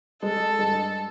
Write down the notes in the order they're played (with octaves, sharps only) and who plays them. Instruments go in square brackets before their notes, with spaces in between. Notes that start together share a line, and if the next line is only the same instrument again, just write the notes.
[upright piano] G#3 [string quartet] A4
[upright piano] G2 G#3